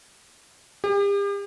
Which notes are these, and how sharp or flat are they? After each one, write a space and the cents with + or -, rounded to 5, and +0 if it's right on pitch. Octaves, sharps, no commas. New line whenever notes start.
G4 +40